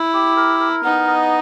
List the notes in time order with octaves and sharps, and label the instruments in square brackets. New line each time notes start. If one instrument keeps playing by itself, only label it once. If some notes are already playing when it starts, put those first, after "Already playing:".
Already playing: [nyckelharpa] E4
[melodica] G4
A#4
A#4
[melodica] B3 [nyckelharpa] D#4
[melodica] D#5